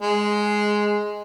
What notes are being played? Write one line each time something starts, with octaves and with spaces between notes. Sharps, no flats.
G#3